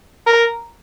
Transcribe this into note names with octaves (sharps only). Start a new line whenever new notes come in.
A#4